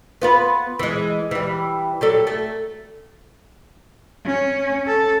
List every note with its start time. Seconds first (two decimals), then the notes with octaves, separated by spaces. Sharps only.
0.22 B3 F4 B4
0.79 E3 G#3
1.31 E3 G3
2.01 F#3 G3 A4
2.27 A3
4.25 C#4
4.87 A4